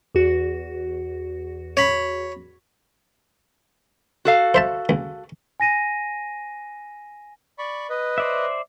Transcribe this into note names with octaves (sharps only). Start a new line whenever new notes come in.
E2 F#4
C#5 B5
F#4 A4 F5
C5 E5 A5
C#2
G#5 A#6 D#7
D5 B5 C#6
B4 D#5
C5 D5 E5